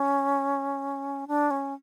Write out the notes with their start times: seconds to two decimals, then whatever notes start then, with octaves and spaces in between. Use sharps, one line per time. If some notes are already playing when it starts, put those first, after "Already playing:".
Already playing: C#4
1.28 D4
1.51 C#4